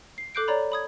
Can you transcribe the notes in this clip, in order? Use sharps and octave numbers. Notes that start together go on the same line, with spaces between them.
C7
A4 D6 F#6 G6 C7 D7
C#5 D5 A#5 B5
B5 D#6 G#6